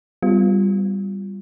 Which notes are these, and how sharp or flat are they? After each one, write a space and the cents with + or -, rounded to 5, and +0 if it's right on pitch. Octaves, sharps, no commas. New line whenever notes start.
G3 +0 B3 +35 F4 +0